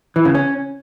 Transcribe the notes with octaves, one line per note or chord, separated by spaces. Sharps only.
E3
C#3
C#4